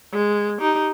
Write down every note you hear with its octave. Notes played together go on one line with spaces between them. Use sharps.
G#3
D#4 G4